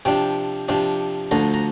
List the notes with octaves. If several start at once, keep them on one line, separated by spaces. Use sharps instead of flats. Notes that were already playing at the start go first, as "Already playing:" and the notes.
C3 F3 D4 G5
C3 F3 D4
D2 D3 F3 A#5
A#5